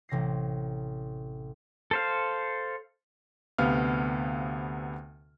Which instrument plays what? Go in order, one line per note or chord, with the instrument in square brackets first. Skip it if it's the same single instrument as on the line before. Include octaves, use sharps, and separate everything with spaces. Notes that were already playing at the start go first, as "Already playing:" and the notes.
[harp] A1 C3 A#6 C7
[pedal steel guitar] A4 C5 F5
[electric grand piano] D2 C3 B3 F5 F6